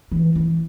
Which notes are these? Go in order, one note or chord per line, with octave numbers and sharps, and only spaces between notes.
E3
E3